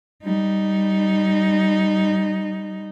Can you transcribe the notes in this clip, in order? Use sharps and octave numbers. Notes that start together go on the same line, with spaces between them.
G3 D#4